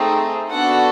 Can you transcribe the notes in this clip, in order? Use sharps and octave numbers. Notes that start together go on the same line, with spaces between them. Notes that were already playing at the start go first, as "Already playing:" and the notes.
Already playing: A3 C4 D#4 G#4
B3 D4 F#4 A4 F#5